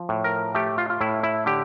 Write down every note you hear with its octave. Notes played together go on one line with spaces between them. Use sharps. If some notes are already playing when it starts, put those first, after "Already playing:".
Already playing: F3
A2
A#4
A3 G4
F4
F4
A2 E4
E4
D3 G4